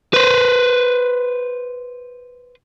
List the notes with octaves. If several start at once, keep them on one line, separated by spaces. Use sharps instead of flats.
B4 C5